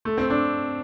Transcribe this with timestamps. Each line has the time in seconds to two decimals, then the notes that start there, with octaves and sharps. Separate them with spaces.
0.05 A3
0.18 C4
0.30 D4